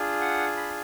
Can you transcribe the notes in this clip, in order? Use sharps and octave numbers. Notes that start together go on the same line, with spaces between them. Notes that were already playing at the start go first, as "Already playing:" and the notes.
Already playing: D4 F4 G#4
F#5
B5